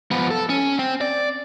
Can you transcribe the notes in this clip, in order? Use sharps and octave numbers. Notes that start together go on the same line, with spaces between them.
F3 B3
A4
C#4
C4
D5